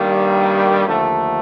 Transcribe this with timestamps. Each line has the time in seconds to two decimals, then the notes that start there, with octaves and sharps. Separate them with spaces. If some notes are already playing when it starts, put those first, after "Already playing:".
Already playing: G2 D#3 G3 A#3
0.87 D#2 D3 F3 A3